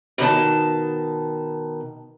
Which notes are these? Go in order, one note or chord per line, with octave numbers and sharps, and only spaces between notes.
B2 D#3 A5